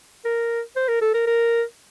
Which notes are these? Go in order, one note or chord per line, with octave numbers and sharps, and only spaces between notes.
A#4
C5
A#4
A4
A#4
A#4